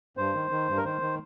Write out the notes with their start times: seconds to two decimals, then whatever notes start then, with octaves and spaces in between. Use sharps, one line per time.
0.17 G2 C5
0.34 D#3
0.51 D#3
0.68 G2
0.77 A#4
0.85 D#3 C5
1.01 D#3